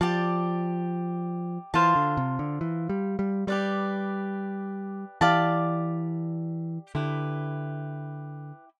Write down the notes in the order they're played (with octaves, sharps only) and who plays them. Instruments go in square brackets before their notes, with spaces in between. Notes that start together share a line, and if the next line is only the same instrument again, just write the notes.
[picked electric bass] F3 [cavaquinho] G4 D5 A5
[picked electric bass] E3 [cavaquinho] F4 C5 F5 A5
[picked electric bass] D3
C3
D3
E3
G3
G3
[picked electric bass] G3 [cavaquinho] G4 B4 D5
[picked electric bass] E3 [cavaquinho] G4 D5 F5 A5
[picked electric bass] D3 [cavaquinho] E4 G4 B4